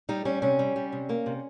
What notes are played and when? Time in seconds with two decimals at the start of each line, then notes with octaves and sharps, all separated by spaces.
0.09 G3 D#4
0.25 G3 C#4
0.42 C3 C#4
0.59 G3
0.76 G3
0.92 C3
1.09 A#3
1.26 C3